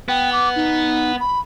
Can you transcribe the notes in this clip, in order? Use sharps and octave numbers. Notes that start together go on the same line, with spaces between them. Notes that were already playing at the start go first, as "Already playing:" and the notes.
B3 G5
D6
D#4
B5